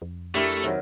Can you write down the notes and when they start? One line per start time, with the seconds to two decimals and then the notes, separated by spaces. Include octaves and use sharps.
0.02 F2
0.35 A3 D4 E4 G4 A#4
0.63 C3 D#3 F#3